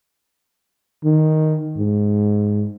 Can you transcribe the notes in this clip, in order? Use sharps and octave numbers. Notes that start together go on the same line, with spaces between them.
D#3
G#2